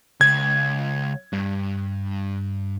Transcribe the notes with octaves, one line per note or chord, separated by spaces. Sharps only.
C#2 G#6
G2